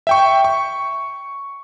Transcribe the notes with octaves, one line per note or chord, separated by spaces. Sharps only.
E5 G5 C#6
C#6